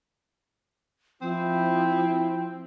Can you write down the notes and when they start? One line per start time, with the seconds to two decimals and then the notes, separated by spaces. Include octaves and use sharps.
1.21 F3 C4 E4